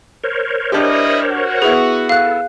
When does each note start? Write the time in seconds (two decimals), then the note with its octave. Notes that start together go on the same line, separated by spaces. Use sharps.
0.24 A#4 C5 C#5
0.72 G3 D4 E4 G4 D#5
1.28 F#4
1.62 B3 E4 G#4 B4
2.09 A4 F5 F#6